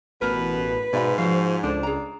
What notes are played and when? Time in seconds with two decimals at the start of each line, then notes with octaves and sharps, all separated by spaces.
0.22 A1 B2 A#4 B4
0.93 G#2 B2 D5 E5 B5
1.18 F3 F#4 C5 F5
1.64 C#2 D4 A4 C5
1.83 G#4 A#5